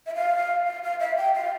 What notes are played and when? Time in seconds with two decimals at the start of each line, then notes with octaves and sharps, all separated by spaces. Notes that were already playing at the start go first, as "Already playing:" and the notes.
0.07 E5
0.15 F5
0.67 F5
0.83 F5
1.00 E5
1.17 G5
1.35 F5